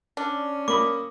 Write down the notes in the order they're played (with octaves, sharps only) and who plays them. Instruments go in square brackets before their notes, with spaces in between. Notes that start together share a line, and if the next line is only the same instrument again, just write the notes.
[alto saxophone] C#4 [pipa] D4
[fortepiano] A#3 B5 D#6 [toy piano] D6